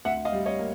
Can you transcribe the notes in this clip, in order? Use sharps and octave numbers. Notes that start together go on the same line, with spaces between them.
D2 E5 F#5
D#5 F5
G3
C#5 D#5
A#3